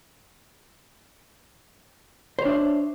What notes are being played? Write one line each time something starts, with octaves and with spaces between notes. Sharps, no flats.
D4 C5 C#5 E5